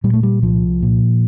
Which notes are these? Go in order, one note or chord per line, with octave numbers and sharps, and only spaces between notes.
A#2 G3
A3
G3
C2 F3
A#2